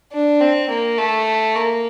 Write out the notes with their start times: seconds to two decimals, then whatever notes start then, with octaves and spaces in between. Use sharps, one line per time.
0.12 D4
0.41 C4
0.69 A#3
0.98 A3
1.55 A#3